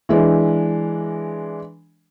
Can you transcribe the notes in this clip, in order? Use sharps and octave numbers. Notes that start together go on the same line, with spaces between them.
E3 G#3 D4